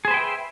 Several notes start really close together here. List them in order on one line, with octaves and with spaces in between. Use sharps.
G#4 C5 B4 G5 E5